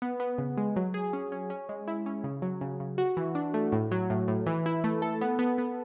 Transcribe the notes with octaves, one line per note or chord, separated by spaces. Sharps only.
B3
B3
C#3
G#3
F#3
G#4
C#4
C#4
C#4
G#3
E4
C#4
C#3
F#3
C#3
C#3
F#4
E3
D4
A3
A2
F#3
A2
A2
E3
E4
A3
A4
B3
B3
B3